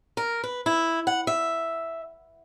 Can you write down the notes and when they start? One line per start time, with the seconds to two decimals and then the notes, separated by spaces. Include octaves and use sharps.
0.17 A#4
0.44 B4
0.66 E4
1.07 F#5
1.27 E5